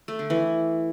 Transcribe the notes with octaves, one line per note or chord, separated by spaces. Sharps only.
A3
D3
E3